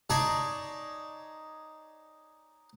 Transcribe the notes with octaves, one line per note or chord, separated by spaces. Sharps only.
D#4 G#4 C#5 D5 A5